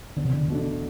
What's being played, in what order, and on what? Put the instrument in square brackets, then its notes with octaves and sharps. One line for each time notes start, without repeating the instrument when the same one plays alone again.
[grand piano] E2 [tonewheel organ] D3
[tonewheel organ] C3
D3
[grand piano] B2 A3 D4